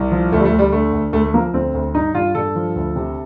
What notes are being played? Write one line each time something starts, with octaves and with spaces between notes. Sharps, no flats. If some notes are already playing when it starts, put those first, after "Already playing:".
Already playing: C2
F3
D2 A3
G3
A3
D2
G3
D3 A3
D2
D2 A3
A3
F3 A#3
D2 C4
D2
G2 D#4
G2 F4
G2 A4
F3
D2
C3